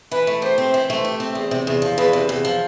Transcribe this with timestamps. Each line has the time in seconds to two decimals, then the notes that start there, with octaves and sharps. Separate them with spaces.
0.11 E3 B4
0.27 A3
0.42 G4 C5
0.58 C4
0.74 E3
0.90 A3
1.05 G4
1.20 C4
1.35 E2
1.51 C3
1.67 E2
1.82 F3
1.98 E2 B4
2.13 C3
2.29 E2
2.45 F3